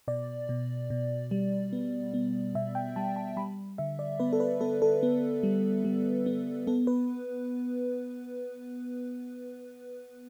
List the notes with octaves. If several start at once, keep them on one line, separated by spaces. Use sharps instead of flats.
B2 D5
B2
B2
G3
B3
B3
B2 E5
G5
G3 A5
A5
G3 B5
D3 E5
D5
B3 B4
A4
B4
B3 A4
A4
B3
G3
G3
B3
B3 A4
B4